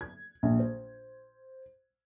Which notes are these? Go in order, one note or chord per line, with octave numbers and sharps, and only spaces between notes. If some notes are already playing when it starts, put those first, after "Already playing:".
G#6
A#1
C5